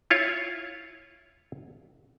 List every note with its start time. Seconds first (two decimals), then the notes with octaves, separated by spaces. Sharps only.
0.10 E4 F4 C#5